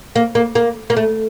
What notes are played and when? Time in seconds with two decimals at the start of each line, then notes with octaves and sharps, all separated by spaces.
0.16 A#3
0.35 A#3
0.55 A#3
0.90 A#3
0.97 A3